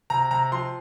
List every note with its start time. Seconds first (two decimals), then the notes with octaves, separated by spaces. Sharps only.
0.10 C3 A#5
0.31 C3 A#5
0.52 F3 C6